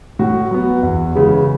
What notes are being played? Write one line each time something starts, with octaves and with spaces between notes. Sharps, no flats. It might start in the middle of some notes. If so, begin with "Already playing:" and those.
A2 F#4
F#3 B3
E2
C#3 E3 G#3